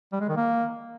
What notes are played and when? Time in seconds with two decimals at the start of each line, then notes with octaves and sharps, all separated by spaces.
0.12 G3
0.21 G#3
0.29 D#3
0.37 A#3